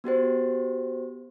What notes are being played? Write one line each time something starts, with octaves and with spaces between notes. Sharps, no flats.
B3 F#4 G4 C5